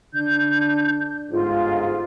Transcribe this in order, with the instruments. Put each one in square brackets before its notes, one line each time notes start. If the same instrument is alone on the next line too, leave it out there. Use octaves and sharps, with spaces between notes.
[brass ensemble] D3 D4 [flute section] G6
[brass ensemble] G1 G#2 [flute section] F4